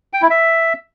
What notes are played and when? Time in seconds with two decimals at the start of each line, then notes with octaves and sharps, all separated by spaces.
0.13 G5
0.22 E4
0.30 E5